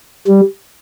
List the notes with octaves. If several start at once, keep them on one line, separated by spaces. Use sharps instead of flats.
G3